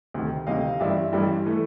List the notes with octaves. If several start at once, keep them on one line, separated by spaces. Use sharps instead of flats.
D2 C3 D#3
D2 C3 D#3 D#5 F5
A1 G2 E3 G3 D5 E5
A1 G2 E3 G3
E3 A3